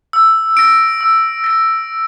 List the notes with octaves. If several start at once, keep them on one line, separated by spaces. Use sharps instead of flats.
E6
A#6 D7
E6
A#6 D7